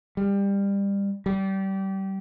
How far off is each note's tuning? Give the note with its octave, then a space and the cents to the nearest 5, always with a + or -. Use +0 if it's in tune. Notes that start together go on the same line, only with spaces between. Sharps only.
G3 +25
G3 -25